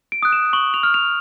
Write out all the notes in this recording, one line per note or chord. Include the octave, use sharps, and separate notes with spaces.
D7
D#6 F#6
E7
C#6 F#7
F7
F6
F7